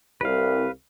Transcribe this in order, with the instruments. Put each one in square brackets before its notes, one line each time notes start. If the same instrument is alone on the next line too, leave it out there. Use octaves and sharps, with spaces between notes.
[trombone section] C2 [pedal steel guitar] B4 F5